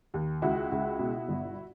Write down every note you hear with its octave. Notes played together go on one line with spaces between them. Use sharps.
D#2
C#2 E4 F#4
C#2
B2
G1